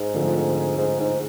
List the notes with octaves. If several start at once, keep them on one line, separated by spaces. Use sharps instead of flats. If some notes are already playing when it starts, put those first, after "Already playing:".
Already playing: G#2
D3 F3 A3 C4
G#2
G#2